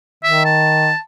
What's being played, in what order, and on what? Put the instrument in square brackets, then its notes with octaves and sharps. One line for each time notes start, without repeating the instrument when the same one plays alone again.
[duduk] D#3 [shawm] E5
[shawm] A5